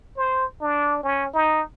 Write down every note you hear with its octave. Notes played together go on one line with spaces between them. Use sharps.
C5
D4
C#4
D#4